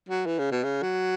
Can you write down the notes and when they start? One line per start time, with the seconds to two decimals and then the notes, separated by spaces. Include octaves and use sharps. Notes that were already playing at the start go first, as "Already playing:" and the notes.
0.09 F#3
0.26 E3
0.39 C#3
0.51 B2
0.64 C#3
0.82 F#3